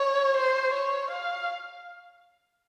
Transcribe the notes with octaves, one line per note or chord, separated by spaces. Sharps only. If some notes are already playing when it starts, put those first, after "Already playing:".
Already playing: C#5
C5
C#5
F5